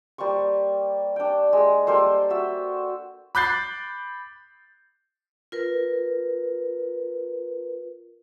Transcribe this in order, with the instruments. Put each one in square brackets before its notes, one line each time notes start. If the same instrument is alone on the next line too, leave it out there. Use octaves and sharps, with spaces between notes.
[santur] G3 A#3 C5 C#6
D4 G5
G#3
G3 A#3 A4 C5
F#4 E5
[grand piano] B5 D6 F#6 G6 A6 C7
[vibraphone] F4 A#4 B4